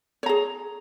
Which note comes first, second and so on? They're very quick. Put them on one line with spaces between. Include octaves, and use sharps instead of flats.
C#5 A#5 G#4